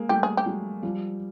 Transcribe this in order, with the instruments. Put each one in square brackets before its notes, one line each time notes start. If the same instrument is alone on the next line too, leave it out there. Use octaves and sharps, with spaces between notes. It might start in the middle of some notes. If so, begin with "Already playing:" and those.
Already playing: [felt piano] G#3 A#3
[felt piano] G3 A3 [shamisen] G4
[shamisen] G#4
G4
[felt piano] F#3 G#3
F3 G3